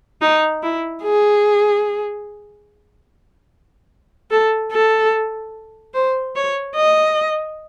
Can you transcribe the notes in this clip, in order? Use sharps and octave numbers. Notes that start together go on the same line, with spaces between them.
D#4
E4
G#4
A4
A4
C5
C#5
D#5